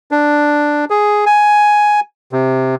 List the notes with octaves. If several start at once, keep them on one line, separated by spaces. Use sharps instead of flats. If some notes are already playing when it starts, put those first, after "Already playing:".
D4
G#4
G#5
C3